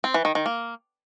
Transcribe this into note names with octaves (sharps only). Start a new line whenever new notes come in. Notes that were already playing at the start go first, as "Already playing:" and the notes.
C4
E3
D#3
D#3
A#3